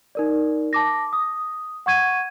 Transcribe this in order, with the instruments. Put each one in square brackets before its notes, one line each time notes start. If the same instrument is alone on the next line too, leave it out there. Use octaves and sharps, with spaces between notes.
[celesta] D#4 A#4 D5
A5 D6 A#6
D#6
F#5 C#6 G#6 D#7